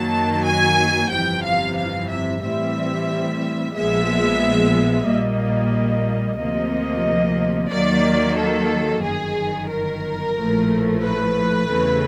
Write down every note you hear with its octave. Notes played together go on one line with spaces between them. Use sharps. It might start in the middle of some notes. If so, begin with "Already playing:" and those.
Already playing: F#2 D#3 F#3 A#3 A5
G#5
G1 F2 C3 E3 G5
F5
F5
E5
A2 E3 G3 C4 E5
A#1 A#2 F3 G#3 B3 E5
A#1 A#2 G3 A#3 D#5
D2 C3 F3 A#3 D#5
D#2 D#3 F#3 A#3 D5
A4
G1 F#2 D#3 G#4
A#4
A#1 A2 F3 A3
B4
E2 C#3 E3 A3 C4